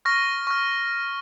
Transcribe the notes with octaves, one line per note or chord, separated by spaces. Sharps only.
C#6 F6 A#6
C#6 F6